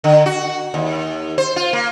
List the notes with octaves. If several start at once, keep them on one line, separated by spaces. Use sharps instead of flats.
D3
F#4
D#2
C5
F4
A#3